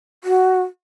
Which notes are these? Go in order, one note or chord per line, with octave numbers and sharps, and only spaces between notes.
F#4